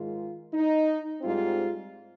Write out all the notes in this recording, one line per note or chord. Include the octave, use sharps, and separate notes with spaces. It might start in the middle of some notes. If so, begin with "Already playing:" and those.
Already playing: G#2 D#3 G#3 F4
D#4
G#2 G3 C4 F4